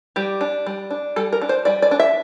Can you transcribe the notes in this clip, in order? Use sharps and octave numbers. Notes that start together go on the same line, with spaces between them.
G3 G4
D4
G3
D4
G3 A4
A#4
D4
C5
G3 D5
D5
D4
E5